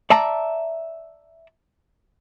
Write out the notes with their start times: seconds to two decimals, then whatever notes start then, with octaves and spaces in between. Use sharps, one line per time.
0.10 D5 E5 A5 A#5